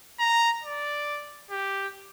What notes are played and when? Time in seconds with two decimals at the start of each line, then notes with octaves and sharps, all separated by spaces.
0.19 A#5
0.64 D5
1.51 G4